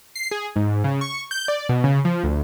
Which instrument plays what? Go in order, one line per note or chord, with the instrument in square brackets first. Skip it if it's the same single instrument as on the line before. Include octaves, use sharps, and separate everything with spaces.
[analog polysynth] C7
G#4
G#2
C#3
C#6
G6
D5
B2
C#3
F3
D2